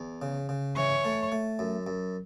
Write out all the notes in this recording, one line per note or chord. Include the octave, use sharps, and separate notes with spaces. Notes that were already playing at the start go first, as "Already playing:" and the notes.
Already playing: E2
C#3
C#3
E3 C#5
A3
A3
F#2
F#2